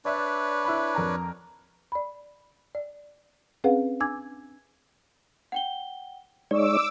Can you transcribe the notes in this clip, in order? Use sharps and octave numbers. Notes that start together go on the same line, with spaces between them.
D4 B4 C#5 D5 E5
E4 B5
F2 A#4 A#5
D5 B5
D5
C4 C#4 G#4 B4 F5 F#5
D4 G#5 D6 E6 G#6
F#5 G5 G7
G#3 D#4 C#5 D5 D6 E6